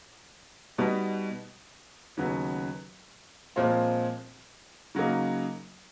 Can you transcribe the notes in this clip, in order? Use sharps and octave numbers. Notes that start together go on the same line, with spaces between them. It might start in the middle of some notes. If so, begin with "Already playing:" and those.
B2 G3 B3 D#4
D#2 C#3 F#3 B3
A#2 F3 G#3 C4 F4
C#3 F#3 A#3 D#4